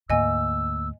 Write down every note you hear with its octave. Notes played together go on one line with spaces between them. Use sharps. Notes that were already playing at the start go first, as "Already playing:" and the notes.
D2 G#2 A3 A#3 D#5 G#5 E6